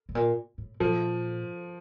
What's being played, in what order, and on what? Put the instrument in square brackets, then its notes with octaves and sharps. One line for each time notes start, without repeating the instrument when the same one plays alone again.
[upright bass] A2
A#2
A2
[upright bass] A#2 [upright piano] F3